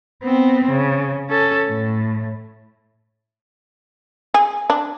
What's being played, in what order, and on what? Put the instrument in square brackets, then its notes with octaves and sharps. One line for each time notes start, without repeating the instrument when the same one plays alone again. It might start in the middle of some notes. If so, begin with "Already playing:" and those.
[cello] B3 C4
C#3
C#4 A4
A2
[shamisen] G#4
D4